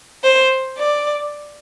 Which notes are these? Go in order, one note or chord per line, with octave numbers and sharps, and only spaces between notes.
C5
D5